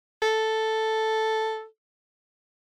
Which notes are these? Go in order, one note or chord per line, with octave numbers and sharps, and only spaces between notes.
A4